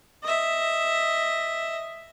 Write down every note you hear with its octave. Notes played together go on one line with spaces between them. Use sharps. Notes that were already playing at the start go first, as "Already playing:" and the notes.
D#5 E5